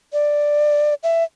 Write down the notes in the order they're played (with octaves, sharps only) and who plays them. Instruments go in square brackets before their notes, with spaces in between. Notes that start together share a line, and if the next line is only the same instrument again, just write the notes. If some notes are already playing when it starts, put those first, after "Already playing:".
[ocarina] D5
E5